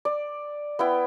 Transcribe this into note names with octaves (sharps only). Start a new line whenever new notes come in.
D5
B3 E4 G5